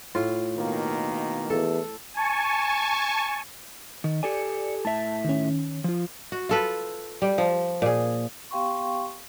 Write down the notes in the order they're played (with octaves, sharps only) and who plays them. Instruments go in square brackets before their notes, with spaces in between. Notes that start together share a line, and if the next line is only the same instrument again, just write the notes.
[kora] A2 F4
[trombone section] B2 D#3 A#3
[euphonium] E2 [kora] A4
[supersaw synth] G#5 A5 C#6
[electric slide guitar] D#3
[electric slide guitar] G4 A4 G#5 [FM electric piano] D5 C#7
[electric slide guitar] A2 E5 [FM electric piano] A5
[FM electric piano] D#3 C#4
[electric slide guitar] F3 F4
[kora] F#4
F4 A4 B4
G3
F3
A#2 G#4
[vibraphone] B3 G4 F5 G5 C6 C#6